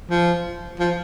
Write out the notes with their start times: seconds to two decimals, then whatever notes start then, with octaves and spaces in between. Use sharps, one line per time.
0.10 F3
0.80 F3